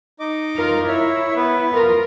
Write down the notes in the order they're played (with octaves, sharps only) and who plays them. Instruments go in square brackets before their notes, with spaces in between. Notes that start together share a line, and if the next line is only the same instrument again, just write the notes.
[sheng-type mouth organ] D#4 D#5 D6
[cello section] F4 A#4
[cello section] E4 [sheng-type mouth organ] C#5 E5
[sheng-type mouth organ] B3 B4
[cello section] F4 A#4